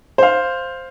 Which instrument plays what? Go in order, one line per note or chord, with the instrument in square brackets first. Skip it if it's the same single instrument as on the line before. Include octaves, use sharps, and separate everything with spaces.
[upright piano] C5 F5